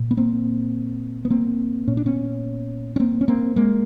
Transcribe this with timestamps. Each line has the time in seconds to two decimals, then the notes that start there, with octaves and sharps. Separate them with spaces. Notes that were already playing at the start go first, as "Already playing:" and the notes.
Already playing: A#2
0.11 B3
0.17 A#3 C4
1.25 B3
1.30 A#3 C4
1.88 A#2 C#4
1.97 D4
2.06 B3 C#4
2.96 C#4
3.00 A#3 C4
3.21 C#4
3.28 A#3 C4
3.56 G#3 A#3